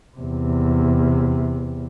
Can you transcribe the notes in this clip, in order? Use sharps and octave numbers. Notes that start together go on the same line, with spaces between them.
E2 C3